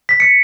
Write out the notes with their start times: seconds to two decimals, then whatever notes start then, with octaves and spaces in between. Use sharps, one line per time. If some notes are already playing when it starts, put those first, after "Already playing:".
0.09 B6
0.20 C#7